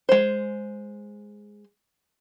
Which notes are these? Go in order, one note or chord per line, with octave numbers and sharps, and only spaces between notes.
G#3 C5